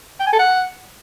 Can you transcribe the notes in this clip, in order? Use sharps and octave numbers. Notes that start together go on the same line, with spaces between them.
G5
G#5
A4
F#5